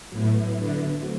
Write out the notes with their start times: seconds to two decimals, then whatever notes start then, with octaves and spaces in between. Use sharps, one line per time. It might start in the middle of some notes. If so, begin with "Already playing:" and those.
0.12 A2 F#3 B3 E4
0.57 D3
1.02 F#3 A3 C4 F#4